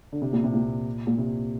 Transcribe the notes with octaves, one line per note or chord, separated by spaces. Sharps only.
D3
C3
A#2
C3
A#2
A#2
C3